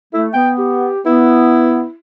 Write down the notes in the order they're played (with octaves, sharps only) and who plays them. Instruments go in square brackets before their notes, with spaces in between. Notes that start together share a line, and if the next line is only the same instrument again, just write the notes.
[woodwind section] A3 [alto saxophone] E4
[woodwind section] B3 [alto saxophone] G5
[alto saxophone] G4
[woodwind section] B3 [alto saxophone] E4